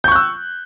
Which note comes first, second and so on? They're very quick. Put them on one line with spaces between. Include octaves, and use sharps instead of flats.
G6 C#6 F#6 E6